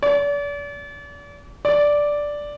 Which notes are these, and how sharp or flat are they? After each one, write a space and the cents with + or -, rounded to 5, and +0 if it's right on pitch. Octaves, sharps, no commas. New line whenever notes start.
D5 -40
D5 -5